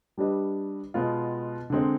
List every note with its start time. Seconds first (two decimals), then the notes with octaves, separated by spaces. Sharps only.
0.18 G3 D4 G4 B4 D#5
0.94 B2 G#3 B3 F4
1.70 D3 G#3 C4 D#4